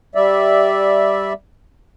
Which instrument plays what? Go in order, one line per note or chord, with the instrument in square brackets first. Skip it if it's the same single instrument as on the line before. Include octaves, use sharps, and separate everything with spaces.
[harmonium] G3 D5 E5